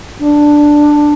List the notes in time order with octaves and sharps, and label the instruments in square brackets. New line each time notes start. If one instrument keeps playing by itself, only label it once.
[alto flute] D4